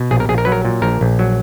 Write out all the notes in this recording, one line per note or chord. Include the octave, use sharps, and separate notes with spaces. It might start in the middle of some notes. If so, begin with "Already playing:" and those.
Already playing: B2
A#1 G#4
A#4
A#1 G#4
A#4
F#3 B4
A#4
A#2
A#1 A#4
A#1
F#3